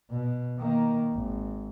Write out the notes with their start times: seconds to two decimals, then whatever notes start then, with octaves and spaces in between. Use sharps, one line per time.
0.11 B2
0.59 D#3 A#3
1.14 G#1